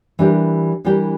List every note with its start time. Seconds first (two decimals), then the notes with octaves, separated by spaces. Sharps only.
0.19 E3 G3 D4 G4 A#4
0.85 E3 G3 D4 G4 A#4